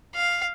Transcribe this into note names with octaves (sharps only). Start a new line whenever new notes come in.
F5